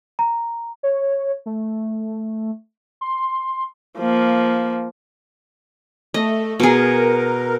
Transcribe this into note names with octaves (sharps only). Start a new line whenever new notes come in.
A#5
C#5
A3
C6
F3 A#3
A3 D#5
B2 G#4 A#4